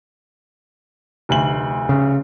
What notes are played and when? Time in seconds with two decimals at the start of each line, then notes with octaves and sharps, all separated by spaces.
1.29 F1 D2 F#7
1.89 C#3